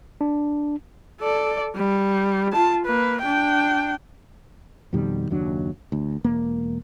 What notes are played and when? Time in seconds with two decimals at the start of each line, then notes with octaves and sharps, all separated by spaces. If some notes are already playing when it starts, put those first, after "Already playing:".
0.21 D4
1.21 A4 D5
1.76 G3
2.53 F4 A5
2.85 A#3 B4
3.21 D4 G5
4.93 F2 B2 D#3 G3
5.31 F#1 D#2 F#3 D4
5.92 D2
6.24 E1 A#3